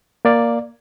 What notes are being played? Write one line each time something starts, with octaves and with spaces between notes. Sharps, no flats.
A#3 D5 F5